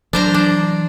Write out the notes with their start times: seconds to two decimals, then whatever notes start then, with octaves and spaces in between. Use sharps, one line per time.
0.13 E3 F#3 D4 C5 A#5
0.34 D4